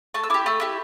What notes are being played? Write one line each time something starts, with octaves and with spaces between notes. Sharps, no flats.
A3 A5
E6
E4 G4 D6
A3 E6
E4 G4